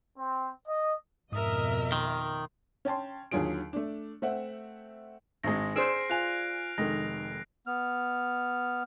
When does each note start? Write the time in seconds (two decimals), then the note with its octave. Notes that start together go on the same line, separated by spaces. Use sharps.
0.18 C4
0.68 D#5
1.32 F2 G#2 B2 A#4 D#5 E5 D#6
1.92 D#3 C6
2.85 C#4 G5 A5 C6
3.31 D#2 D3 F#3 F4 G#4 D7
3.73 A3 D4
4.22 A3 C4 E5 F#5
5.44 G#1 G#3 A#6
5.76 G#4 C5 D5 E6 F6 C7 D7
6.10 F4 G#5 F#6 F7
6.78 F1 D#3 G#3 A4 A#6
7.67 B3 F6